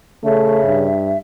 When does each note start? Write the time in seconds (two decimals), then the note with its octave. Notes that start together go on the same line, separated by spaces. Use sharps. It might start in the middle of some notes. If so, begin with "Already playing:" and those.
0.24 C#3 A3 E5
0.65 G2